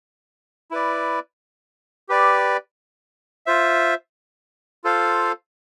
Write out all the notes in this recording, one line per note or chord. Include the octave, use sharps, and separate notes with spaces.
E4 B4 D5
G4 B4 D5
F4 C5 E5
F4 A4 C5 F5